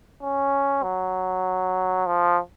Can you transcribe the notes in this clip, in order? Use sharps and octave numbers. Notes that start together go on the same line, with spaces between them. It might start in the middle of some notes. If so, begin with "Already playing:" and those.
C#4
F#3
F3